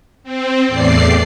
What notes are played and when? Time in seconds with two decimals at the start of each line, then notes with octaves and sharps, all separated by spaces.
0.24 C4
0.68 E2 A2 D5 C7